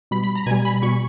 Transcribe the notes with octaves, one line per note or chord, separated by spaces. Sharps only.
B2 G3 B5
B5
A#5
B2 G3 G#5
B5
B2 G3 C#6